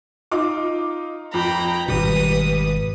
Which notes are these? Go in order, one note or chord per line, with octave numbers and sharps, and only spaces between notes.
D#4 F4 D6
F2 G5 A#5 B5
G#1 B2 G3 B4 D#6